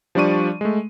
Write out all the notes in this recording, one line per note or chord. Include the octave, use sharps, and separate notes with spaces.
F3 G3 D4 D5 C#6 D#7
G#3 A3